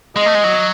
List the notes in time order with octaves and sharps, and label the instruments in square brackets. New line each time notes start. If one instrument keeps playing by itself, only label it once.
[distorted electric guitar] G#3 [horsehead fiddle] D#5
[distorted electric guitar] A3
G#3
F#3